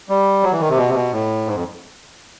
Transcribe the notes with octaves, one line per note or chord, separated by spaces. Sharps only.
G3
F#3
E3
D#3
C3
B2
C3
B2
A2
G#2
F2